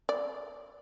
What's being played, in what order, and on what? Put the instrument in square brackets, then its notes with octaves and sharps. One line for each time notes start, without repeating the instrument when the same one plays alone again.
[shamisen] D5